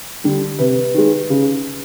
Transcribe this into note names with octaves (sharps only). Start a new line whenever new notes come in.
D3 G3
C3 B4
D#3 G#3
C#3